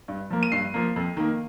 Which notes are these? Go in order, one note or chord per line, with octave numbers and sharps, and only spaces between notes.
G2
F3 A#3
D#7
G2 C7
F3 A#3
F2
D#3 A#3